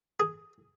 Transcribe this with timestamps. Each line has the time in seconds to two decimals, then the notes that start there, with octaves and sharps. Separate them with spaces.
0.20 G#4